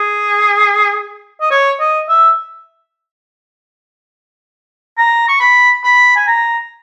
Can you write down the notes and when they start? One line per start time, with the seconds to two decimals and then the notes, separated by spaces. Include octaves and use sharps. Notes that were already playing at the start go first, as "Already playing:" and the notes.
Already playing: G#4
1.41 D#5
1.51 C#5
1.80 D#5
2.09 E5
4.98 A#5
5.29 C#6
5.40 B5
5.84 B5
6.17 G#5
6.27 A#5